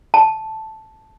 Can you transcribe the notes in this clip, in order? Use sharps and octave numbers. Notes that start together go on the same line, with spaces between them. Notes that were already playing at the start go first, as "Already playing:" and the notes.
A5